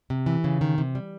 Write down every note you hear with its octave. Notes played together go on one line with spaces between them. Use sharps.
C3
E3
C#3
D#3
C3
G3